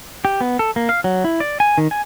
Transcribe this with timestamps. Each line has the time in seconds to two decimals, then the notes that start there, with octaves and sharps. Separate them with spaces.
0.25 G4
0.41 B3
0.59 A4
0.76 A#3
0.89 F5
1.04 F#3
1.24 E4
1.40 D5
1.60 G#5
1.78 D#3
1.91 G#5